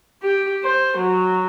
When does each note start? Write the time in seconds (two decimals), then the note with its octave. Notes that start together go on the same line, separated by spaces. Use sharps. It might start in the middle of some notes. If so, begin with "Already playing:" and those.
0.23 G4
0.64 C5
0.97 F#3